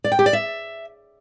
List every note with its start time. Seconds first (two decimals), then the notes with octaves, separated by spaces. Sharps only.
0.04 D5
0.12 G5
0.19 G4
0.26 D5
0.33 E5